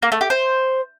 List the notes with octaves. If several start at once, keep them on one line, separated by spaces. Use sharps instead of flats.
A#3
A3
G4
C5